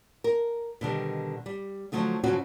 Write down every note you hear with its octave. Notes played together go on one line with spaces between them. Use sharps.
A#4
B2 D3 D#3 G3
G3
D3 F3 F#3 A3 D#4
G2 C#3 F3 F#3 C#4 F#4